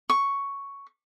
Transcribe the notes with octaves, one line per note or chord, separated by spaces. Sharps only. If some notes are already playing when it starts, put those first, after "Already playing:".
C#6